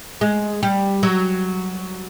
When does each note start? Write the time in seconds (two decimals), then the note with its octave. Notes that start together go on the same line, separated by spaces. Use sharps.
0.21 G#3
0.63 G3
1.03 F#3